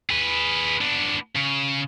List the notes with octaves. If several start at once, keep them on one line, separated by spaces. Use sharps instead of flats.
G#4 B4
B3 D4
C#3